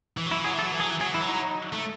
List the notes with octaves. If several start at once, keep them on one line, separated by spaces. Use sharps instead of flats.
E3
F#3
E4
E3
F#3 G#4
E3
A4
F#3
E3
F#3 G#4
E3
F#3 G#4
E3 E4
F#3
D#4
A3